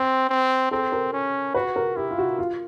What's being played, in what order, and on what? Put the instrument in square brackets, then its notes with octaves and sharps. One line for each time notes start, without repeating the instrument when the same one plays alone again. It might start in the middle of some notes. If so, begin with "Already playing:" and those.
Already playing: [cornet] C4
C4
[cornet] C4 [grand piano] A4
[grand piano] A#4
[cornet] C#4
[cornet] F#4 [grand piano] B4
[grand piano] A#4
[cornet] E4 [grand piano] G4
[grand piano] F4
F#4
F4